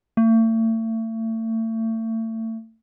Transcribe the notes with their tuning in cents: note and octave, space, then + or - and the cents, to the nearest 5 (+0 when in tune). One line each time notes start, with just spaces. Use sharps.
A3 +35